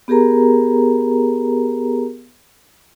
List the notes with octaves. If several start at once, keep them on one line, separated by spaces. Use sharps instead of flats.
B3 G4 G#4 A#4 A#5